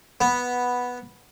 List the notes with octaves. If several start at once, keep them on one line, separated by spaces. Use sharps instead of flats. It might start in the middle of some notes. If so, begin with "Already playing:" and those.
B3